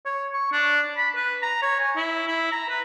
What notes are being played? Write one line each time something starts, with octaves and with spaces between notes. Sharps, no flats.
C#5
C#6
D4
B5
B4
A#5
C#5
G#5
E4
E4
A#5
B4